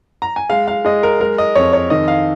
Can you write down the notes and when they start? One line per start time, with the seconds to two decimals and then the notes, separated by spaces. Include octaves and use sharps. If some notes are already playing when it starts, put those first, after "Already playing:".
0.22 A#5
0.36 G#5
0.50 G#3 F5
0.68 F5
0.85 G#3 D#5
1.03 A#4
1.20 G#3 A#4
1.38 D#5
1.55 F2 C#5
1.73 C#5
1.90 D#3 D#5
2.08 F5